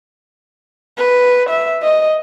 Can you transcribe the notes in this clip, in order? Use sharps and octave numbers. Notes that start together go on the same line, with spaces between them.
B4
E5
D#5